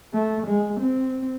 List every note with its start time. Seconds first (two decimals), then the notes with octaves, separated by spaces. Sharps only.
0.14 A3
0.47 G#3
0.80 C4